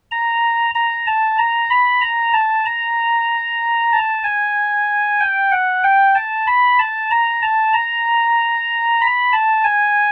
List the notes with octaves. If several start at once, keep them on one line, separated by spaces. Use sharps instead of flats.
A#5
A#5
A5
A#5
B5
A#5
A5
A#5
A5
G#5
G5
F#5
G5
A5
B5
A5
A#5
A5
A#5
B5
A5
G#5